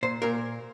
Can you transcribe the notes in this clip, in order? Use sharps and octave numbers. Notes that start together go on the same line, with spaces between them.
A#2 C5
A#2 A#4